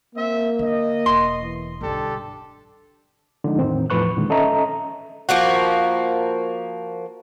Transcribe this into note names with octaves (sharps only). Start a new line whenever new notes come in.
A#3 C4 E5
D3 D#5
E1 C6
E3
B1 G2 D3 D4 G4 A4
D3 F3 G#3 D4 D#4
E2 A2 D#3 C4
E2 A2 F3 B4 C#6 F#6
A#2 D3 D#3 G#3
C#4 A4 D#5 E5 A#5
F3 A#3 F#4